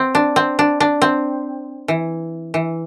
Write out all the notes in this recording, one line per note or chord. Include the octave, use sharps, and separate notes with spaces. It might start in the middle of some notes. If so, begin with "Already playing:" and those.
Already playing: C4
D4
C4
D4
D4
C4
E3
E3